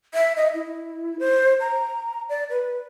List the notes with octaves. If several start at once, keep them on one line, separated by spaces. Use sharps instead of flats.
E5
D#5
E4
C5
A#5
D5
B4